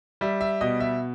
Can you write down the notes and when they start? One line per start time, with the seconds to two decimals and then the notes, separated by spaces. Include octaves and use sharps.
0.21 G3 E5
0.41 E5
0.61 B2 D#5
0.80 E5